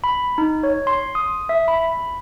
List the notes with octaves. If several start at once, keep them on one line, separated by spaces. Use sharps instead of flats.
B5
D#4
C#5
C6
D#6
E5
B5